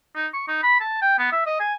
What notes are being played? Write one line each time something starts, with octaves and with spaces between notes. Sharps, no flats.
D#4
C#6
D#4
B5
A5
G5
B3
E5
D#5
G#5